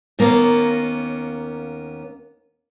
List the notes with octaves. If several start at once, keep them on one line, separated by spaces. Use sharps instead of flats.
D#2 A#3 B3 C#4